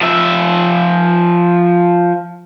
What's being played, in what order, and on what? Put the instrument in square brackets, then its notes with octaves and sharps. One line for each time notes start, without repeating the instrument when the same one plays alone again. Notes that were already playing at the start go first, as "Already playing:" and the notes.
[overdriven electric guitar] F3 E5